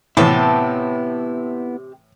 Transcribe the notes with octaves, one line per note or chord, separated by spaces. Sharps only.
A2 C3 E3 B3 E4 G5 A5